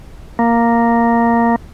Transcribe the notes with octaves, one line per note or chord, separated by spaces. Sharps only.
A#3